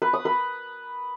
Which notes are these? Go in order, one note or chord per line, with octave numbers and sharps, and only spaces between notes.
B4
D#6
B4